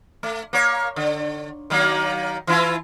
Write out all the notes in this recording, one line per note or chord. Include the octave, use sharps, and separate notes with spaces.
A3
A#3 C#5
D3
D#3 F#3 A#3
E3 E4 F4